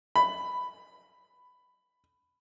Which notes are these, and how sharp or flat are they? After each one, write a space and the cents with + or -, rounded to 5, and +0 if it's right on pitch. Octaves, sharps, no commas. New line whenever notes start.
B5 +10